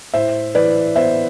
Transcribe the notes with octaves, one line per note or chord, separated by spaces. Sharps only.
A2 C5 E5
E3 B4 D5
B3 C5 E5